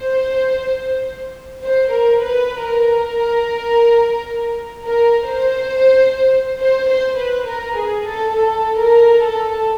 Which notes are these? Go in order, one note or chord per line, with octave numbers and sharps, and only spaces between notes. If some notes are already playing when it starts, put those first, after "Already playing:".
Already playing: C5
C5
A#4
B4
A#4
A#4
C5
C5
C5
B4
A#4
G#4
A4
A4
A#4
A4